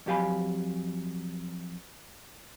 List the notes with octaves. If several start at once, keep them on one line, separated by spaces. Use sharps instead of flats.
F2 F#3 G4 F5 G#5 B5